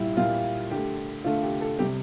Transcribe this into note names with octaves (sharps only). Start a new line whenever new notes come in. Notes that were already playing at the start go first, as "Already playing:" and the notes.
Already playing: A#2 G3 E4
A#2 G3 F4
D3 A3 G4
D3 A3 F4
G4
A4
C3 G3 G4